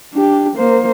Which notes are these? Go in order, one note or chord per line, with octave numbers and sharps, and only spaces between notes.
D4 G4
A#3 C5